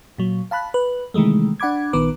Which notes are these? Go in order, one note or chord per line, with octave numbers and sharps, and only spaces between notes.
A#2 F#3
F5 A5 B5 F#6
B4
C3 D#3 E3 G#3 A3
D4 F#5 B5 D6 G#6
A#1 D#3 B3 B4 D6